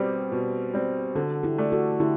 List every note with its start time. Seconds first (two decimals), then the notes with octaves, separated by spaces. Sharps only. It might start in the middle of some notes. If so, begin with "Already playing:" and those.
Already playing: B2 G3 C4 G4 B4
0.32 B2
0.74 G3 C4
1.15 D3 F#4 A4
1.43 E4 G4
1.58 A3 D4
1.72 F#4 A4
2.00 D3 E4 G4